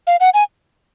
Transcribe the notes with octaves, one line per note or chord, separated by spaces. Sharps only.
F5
F#5
G#5